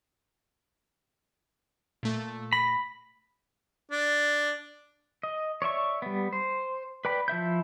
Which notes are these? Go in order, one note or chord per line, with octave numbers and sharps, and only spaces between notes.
A#2 A3
B5 A#6
D4
D#5
C#5 D5 E5 C#6
G3 B3
C5
B4 D5 G5 B5
F3 E4 E5 G6